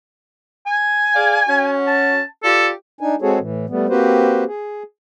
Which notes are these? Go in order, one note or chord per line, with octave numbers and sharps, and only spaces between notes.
G#5
G#4 D5 F5
C#4 F#4
A5
F4 G4 A4 D5
D4 D#4 G#5
G#3 C4 F#4 G#4 A4 C#5
A2 E3
G3 A3 B3
A#3 C4 F#4 G4 B4 C5
G#4